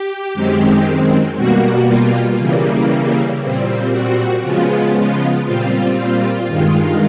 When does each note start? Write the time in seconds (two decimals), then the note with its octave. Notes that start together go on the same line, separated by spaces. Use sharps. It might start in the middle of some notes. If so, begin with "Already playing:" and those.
Already playing: G4
0.34 F#2 D#3 G#3 C4
1.37 B2 G3 A#3 F#4
1.87 F4
2.38 C#3 E3 G3 A#3
3.41 A#2 G3 C4
3.92 F#4
4.43 C#3 F3 G#3 B3 F4
4.95 F4
5.45 A#2 G3 C4 F4
5.97 F4
6.48 G2 D#3 G#3